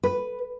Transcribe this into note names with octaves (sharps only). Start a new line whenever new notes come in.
B4